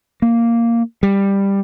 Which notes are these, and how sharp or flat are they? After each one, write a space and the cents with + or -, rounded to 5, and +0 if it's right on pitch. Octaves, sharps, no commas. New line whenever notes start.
A#3 -5
G3 +10